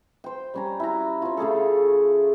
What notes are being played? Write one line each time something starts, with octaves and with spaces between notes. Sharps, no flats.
C5 G5
G3 C#4 A#5
E4 F#4 A#5
C#4 F4
C#3 A3 G#4 A4